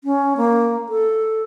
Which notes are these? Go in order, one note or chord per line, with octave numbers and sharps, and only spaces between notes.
C#4
A#3
A4